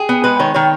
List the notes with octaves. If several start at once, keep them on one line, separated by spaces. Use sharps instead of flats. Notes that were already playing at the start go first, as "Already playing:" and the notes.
Already playing: G#4
B3
G#3 B4
D#3 C#5
D#3 C#5